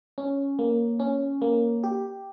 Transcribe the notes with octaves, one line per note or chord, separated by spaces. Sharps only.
C#4
A#3
C#4
A#3
G4